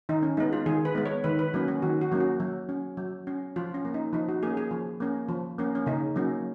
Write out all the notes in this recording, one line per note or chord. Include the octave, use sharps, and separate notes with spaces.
D#3 D#4
C#4
G#3 B3 D#4
F4
D#3 G#4
B4
G#3 B3
C#5
D#3 B4
B4
F#3 A#3 C#4 B4
C#4
D#3 F#4
F#4
F#3 A#3 C#4
F#4
F#3
C#4
F#3
C#4
F3 F4
C#4
A#3 C#4
D#4
F3 D#4
F#4
A#3 C#4 G#4
G#4
F3
A#3 C#4
F3
A#3 C#4
C#4
C#3 D#4
F#3 A#3 C#4